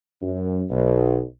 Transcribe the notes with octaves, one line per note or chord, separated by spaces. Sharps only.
F#2
B1